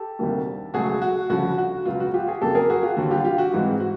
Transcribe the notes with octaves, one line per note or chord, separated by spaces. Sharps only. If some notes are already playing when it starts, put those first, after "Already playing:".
Already playing: G4 A4
D2 C3 D#3 G3 A#3
C#2 B2 F#3 A3 F#4 G#4
F#4
D2 C#3 F3 F#4
F#4
C#2 B2 F#3 B3 F4
F#4
F4 G4
F#4 G#4
F2 C#3 F#3 A#3 G4 A4
G#4 A#4
F#4 G#4
F4 G4
D#2 D3 G3 F#4
F4 G4
F4 G4
F#4
G#2 E3 G#3 C4
F#4